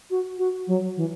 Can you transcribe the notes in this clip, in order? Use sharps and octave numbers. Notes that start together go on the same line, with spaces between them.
F#4
F#4
F#3
E3